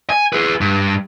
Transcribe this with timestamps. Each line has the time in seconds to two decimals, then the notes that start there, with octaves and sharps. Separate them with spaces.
0.10 G#5
0.33 G#4 B4
0.61 G2